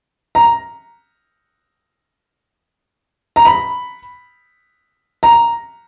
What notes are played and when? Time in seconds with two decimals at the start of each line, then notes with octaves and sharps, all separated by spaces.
0.35 A#5
3.36 A#5
3.45 B5
5.23 A#5